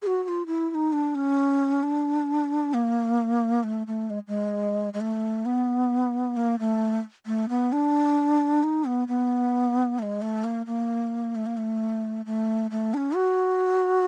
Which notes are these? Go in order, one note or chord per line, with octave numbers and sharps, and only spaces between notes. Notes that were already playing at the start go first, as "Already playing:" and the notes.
G#4
F#4
F#4
F4
E4
E4
D#4
D4
C#4
D4
A#3
A3
A3
G#3
G#3
G#3
A3
B3
A#3
A3
A3
B3
D4
D#4
B3
B3
A3
G#3
A3
A#3
A#3
A3
A#3
A3
A3
A3
D4
C#4
F#4